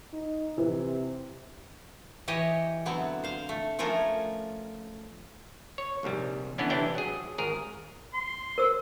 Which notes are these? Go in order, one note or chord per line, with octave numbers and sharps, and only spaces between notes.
D#4
C3 E3
E3 G4 C#5 D#5
D3 F#3 B3 C4 E4
C5 F5
A3
F3 A3 C#4 F4 A#4 G#5
C#5
A#1 G#2 C3 G3
D3 E3 B3 C#4 D4
C3 E3 D4 E4 G5
F#3 G#4
G#1 G#4 A#4
C6
A#4 C5 E6